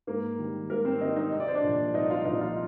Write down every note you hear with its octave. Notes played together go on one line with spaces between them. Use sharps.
G#2 A#3 A#4
D#3 G3
G#2 A#3 A#4
C4 C5
D#3 G3 D#4 D#5
D#4 D#5
C2 D#5
D5
C5
D4 D5
A#2 F3
C2 D#4 D#5
F4 F5
A#2 F3 D#4 D#5
F4 F5